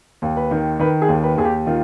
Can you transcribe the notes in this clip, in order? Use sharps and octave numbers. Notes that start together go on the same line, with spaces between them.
D#2
B4
D#3
D#3 B4
G#4
D#2
B4
D#2 G#4
G4
D#3 F4